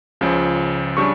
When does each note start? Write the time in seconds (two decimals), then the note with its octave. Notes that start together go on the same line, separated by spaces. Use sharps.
0.21 C#2 C#3 F3
0.97 C#3 G3 D4 C#6